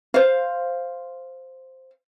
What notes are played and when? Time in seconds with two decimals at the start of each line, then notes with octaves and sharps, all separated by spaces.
0.14 C5 F5